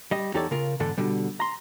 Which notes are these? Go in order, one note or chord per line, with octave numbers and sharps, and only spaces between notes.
G3 D#5
E2 D#4 G4 A4 C#5 D5
C#3 F4 A#4
E2 G#2 D3 D4 A4
B2 D3 G3
A#5 C6